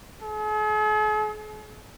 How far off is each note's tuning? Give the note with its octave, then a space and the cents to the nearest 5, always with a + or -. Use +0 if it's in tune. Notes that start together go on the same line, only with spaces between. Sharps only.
G#4 +45